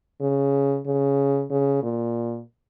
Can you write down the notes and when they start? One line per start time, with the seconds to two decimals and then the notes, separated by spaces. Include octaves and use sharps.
0.21 C#3
0.86 C#3
1.51 C#3
1.83 A#2